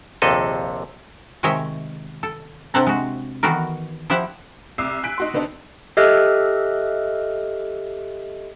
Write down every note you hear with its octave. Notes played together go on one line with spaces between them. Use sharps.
A#1 D#2 C3 A4 D#5
C3 D#3 G#3 C#5 D#5 E5
A4
C3 C4 D4 A4 F#5 A#5
G#3 F#4
D#3 E3 B3 F#4 A4 A#4
F3 E4 G4 E5 F#5
C2 D6 E6 C7
G#5 F#6 B6 D7
D#4 F#4 C6
D3 B3 C4 D4 D#4
G4 A4 D#5 E5 F6 F#6